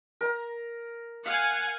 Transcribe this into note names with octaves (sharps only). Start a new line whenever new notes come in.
A#4 A#5
F5 F#5 G#5